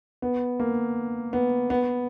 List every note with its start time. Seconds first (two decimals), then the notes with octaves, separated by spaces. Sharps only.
0.22 B3
0.60 A#3
1.33 B3
1.70 B3